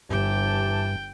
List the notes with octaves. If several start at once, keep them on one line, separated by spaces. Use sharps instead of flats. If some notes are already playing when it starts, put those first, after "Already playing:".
G1 G2 E3 G4 G5 A5